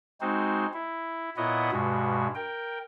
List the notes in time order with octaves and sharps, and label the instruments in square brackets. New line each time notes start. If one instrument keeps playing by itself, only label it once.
[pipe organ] G#3 C4 D#4 F#4 C5
E4
A#2 B3 E4 C#5 D#5 F#5
G2 B2 G#3 F#4
A#4 G5